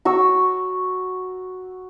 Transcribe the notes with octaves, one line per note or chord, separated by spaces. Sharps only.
F#4 C#6 E6